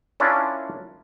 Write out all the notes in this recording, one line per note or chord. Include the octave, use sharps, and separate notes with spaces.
C#4 D4 E4 F4 A#4 D5